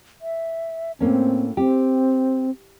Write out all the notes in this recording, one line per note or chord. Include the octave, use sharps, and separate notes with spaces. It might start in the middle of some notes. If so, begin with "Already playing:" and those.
E5
A2 A#3 C4 C#4
C4 G4